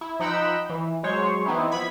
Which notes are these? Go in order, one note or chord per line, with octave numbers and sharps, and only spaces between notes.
E4
F3 D#4 F#5 G5 B5 E6
E3
F#3 G#3 C5 C#5
E3 B3 C4 D#4 E4
F3 B3 E4 B5 G#6 B6